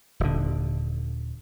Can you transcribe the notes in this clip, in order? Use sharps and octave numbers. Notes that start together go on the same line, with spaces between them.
D#1 D3